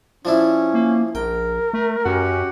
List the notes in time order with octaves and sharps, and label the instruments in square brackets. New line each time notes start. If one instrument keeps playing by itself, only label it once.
[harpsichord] F3 D4 E4 [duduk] C#4
[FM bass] A#3
[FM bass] A#1 [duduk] A#4 [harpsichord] G5
[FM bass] A3
[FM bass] F#2 [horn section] C#4 F#4 G4